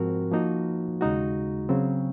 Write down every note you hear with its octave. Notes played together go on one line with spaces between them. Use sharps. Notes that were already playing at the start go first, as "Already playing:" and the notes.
Already playing: G#2 F3 C4 F#4 A#4
F3 A#3 D#4 F#4
D#2 C#3 G#3 D#4 F#4
C#3 F#3 C4